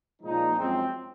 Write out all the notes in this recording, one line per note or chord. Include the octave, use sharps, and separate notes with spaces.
A#2 F3 G#3 D#4
F#2 F3 G#3 C4